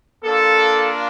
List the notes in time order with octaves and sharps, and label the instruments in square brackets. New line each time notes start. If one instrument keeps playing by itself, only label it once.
[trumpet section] A#3 D4 F4 A4